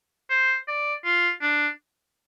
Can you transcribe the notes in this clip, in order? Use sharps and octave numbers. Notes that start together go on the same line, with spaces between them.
C5
D5
F4
D4